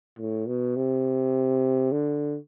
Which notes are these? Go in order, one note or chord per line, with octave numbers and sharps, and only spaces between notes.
A2
B2
C3
D3